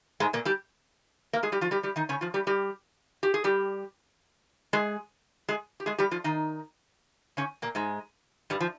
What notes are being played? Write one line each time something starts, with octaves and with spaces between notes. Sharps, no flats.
G#2 G#3
A#2 A#3
G3 G4
A#3 A#4
G#3 G#4
G3 G4
F3 F4
G3 G4
G3 G4
D#3 D#4
C#3 C#4
F3 F4
G3 G4
G3 G4
G4
G#4
G3 G4
G#3 G#4
G#3 G#4
G4
G#3 G#4
G3 G4
F3 F4
D#3 D#4
C#3 C#4
A#2 A#3
G#2 G#3
G2 G3
F3